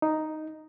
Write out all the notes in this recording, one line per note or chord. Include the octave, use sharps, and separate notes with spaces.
D#4